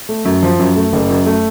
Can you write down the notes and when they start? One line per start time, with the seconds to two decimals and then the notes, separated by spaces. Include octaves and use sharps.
0.09 A3
0.25 F#2
0.43 F3
0.59 F#2
0.76 A3
0.93 F#1
1.10 F#2
1.26 A3